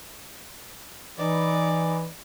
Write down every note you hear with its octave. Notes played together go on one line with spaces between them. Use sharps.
E3 D#4 D5